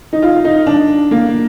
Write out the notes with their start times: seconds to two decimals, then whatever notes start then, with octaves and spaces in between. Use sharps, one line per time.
0.13 D#4
0.22 F4
0.45 D#4
0.67 D4
1.11 A#3